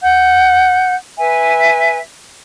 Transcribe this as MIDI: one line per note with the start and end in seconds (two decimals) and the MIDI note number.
0.03 0.95 78
0.03 0.95 91
1.18 1.98 71
1.18 1.98 76
1.18 1.98 80